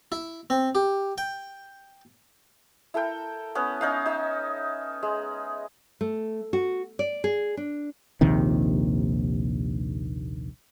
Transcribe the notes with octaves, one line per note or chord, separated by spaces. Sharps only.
E4
C4
G4
G5
E4 A4 A#4 G5
B3 C#4
C#4 D#4 F5
D#4 E5
G#3
A3
F#4
D5
G#4
D4
A#1 D#2 C3 D#3